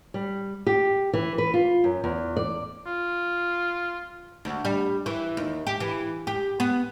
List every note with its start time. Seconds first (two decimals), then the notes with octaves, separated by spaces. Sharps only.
0.14 G3
0.67 G4
1.13 E3
1.38 B4
1.54 F4
1.84 F#2
2.04 E2
2.37 D5
2.86 F4
4.45 D2
4.65 G3
5.06 E3
5.37 D#2
5.67 G4
5.80 E3
6.27 G4
6.60 B3